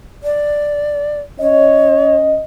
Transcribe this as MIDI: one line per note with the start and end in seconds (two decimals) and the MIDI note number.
0.23 1.19 74
1.39 2.41 61
1.39 2.16 73
1.39 2.41 75